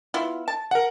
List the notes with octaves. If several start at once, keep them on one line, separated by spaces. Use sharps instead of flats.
B3 E4 F4
A5
A#4 F#5